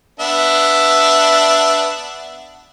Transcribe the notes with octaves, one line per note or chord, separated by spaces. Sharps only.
B3 D4 E5